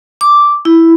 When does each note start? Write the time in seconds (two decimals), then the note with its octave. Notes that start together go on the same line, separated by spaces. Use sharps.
0.21 D6
0.65 E4